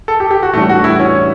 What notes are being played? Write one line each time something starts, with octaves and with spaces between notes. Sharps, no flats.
A4
G4
G4
F#4
A2 E3 G3 A3 D4
F#4
E4
C#4